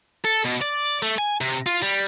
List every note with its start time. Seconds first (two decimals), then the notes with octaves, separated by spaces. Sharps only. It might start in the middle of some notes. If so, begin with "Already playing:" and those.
0.24 A4
0.45 B2
0.61 D5
1.02 A3
1.18 G#5
1.41 C3
1.67 F4
1.83 G3